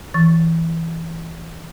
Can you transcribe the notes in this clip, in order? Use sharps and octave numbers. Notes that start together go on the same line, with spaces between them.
E3 C#6 A6